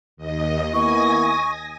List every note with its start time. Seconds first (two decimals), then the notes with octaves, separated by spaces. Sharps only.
0.17 D#2 D#5
0.74 A#3 B3 E4 G#5 C#6 D#6 A#6